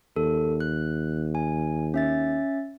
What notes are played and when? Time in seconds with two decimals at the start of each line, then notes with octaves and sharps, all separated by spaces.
0.16 D#2 A4
0.60 F#6
1.35 G#5
1.94 C#4 E5 A6